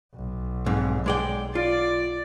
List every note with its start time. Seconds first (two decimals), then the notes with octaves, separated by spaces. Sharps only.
0.14 B1
0.66 F2 G#2
1.06 G#3 D5 G5
1.55 F4 D5